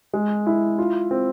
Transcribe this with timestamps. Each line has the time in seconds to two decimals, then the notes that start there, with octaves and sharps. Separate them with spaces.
0.13 G#3
0.47 E4
0.78 F4
1.11 C4